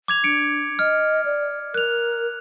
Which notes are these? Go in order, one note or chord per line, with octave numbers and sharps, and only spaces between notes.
D6 G#6 F7
D4 C#7 D7
D#5 F6
D5
A#4 F#6 F7